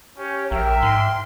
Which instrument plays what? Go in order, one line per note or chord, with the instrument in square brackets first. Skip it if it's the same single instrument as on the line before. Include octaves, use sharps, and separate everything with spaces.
[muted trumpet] C#4 [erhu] G4 [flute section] C#5
[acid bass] A#1 [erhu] A#4 [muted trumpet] E5 [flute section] G5 F6
[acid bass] G#2 [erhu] C6